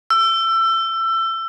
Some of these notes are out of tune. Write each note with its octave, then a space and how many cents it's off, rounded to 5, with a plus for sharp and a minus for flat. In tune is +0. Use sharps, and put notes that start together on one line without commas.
E6 +25